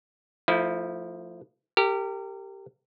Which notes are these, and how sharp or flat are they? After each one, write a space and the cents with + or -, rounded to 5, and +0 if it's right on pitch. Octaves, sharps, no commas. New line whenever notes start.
F3 +0 A3 +20 E4 -20
G4 +0 A#4 -35